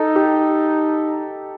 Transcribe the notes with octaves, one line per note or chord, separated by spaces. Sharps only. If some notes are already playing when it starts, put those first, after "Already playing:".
Already playing: D#4 A4
G4